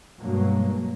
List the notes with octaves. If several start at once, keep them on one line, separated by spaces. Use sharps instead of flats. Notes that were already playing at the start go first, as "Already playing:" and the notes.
G2 B2 F#3 G#3 A#3